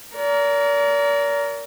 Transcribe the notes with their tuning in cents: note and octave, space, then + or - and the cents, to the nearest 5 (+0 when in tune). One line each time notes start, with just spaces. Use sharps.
A#4 +0 D5 -40